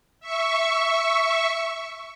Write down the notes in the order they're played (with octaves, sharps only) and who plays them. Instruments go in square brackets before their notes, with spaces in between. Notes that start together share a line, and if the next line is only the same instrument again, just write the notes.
[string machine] E5 C#6